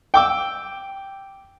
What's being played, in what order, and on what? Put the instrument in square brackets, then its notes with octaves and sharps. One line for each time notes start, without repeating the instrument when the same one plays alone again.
[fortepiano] G5 D6 E6